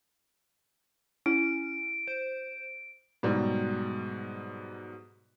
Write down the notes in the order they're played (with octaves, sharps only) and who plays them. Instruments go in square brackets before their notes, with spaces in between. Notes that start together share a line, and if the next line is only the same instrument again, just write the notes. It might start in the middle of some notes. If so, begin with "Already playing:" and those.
[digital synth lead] C#4 [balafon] E4 [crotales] D7
[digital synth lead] C5
[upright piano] G#2 B2 F#3 G3